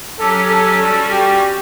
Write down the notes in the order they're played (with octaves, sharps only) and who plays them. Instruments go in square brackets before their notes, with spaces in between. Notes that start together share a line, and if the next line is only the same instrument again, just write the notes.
[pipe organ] F#3 C#4 G4 [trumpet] A4
[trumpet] A4
[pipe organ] G3 C#4 F#4 [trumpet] A4
[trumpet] G4